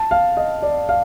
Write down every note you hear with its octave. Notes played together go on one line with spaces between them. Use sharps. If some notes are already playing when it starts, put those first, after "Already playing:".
Already playing: A5
F5
D#5
D5
F5